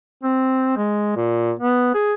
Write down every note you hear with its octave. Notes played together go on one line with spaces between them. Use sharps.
C4
G#3
A#2
B3
G#4